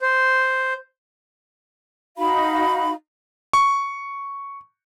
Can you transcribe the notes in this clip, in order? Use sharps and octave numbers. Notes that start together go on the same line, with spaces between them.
C5
D#4 F#4 F5 B5
C#6